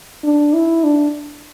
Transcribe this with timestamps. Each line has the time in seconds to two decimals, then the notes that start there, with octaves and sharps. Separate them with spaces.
0.24 D4
0.53 E4
0.84 D4